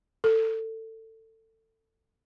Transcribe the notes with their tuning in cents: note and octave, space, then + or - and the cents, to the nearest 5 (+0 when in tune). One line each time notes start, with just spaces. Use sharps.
A4 +20